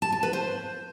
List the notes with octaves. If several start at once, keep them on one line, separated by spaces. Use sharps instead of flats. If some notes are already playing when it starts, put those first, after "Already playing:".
A5
A5
B4
C5